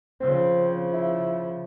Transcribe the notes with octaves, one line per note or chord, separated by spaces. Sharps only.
C#3 F3 C4
E4